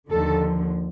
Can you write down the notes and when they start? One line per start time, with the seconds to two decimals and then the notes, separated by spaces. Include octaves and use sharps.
0.09 D#2 D3 F3 A4